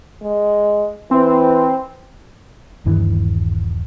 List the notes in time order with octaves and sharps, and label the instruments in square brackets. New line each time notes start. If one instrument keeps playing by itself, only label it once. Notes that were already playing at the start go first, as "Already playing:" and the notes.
[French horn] G#3
[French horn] E3 [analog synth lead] C4
[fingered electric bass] D#1 G2 D#3 E3